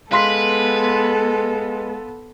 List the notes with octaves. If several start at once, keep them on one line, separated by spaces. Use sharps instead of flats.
G#3 B3 A4 B4 F5 C6 B6